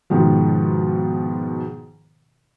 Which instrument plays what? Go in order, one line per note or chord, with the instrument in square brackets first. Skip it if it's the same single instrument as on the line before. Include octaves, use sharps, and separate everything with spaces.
[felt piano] G#2 B2 D#3 F3